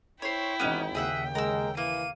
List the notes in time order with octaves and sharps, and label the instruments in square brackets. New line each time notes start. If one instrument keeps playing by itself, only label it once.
[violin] E4 G5 [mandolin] C5 C#5
[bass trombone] G#1 [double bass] E3 D#4 [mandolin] B3 C#4 G4
[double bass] D#2 C#3 [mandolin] G#4 E5 F#5 [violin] G5
[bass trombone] G#3 [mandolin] A#4 E6
[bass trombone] E3 [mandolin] A#3 [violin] D#7